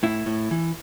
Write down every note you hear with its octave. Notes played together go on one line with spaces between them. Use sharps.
A2 E4
A2
E3